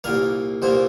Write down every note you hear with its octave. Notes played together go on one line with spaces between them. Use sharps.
C2 A#2 A#3 F5
C2 A#2 A#3 C5